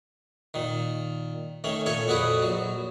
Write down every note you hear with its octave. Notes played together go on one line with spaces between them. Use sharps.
A#2 D#3
D#3 A3 C#4
A#2 A4 C#5 G#5
F2 A#2 F#4 G#4 A4 B4
A#1 F#3